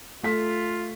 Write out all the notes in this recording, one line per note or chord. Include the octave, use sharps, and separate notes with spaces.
A3 F4 B6